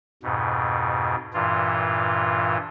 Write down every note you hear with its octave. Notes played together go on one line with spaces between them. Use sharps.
F2 G#2 B2
G2 A#2 E3 F4